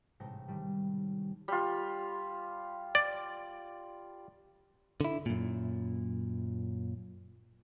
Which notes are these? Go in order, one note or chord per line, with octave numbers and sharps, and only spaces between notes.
A1 G#2 C3 A3 G5 A#6
D#3 G3 A3
G3 F4
D5
D3 E4
F#2 A#2